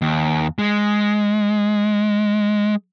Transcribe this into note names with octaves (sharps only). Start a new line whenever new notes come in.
D#2
G#3